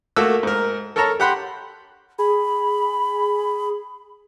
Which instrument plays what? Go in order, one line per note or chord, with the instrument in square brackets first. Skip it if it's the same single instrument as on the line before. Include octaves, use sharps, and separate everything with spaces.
[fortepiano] A3 A#3 F#4 D6 E6
G#2 A#4
A4 A#4 C#5 A5 A#5
G4 F#5 B5 C6
[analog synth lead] G#4 [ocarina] B5